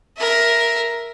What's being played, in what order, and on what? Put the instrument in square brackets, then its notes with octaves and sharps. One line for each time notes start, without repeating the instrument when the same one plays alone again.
[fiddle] A#4 E5